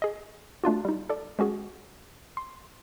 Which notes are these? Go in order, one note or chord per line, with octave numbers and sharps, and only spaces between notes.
G#4 D#5
A3 D4 F4 F#4
G3 D#4
A4 D5
G#3 C#4 F#4 G#4
C6